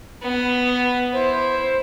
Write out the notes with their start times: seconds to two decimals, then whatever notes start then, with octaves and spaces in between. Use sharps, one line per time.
0.22 B3
1.13 E4 C5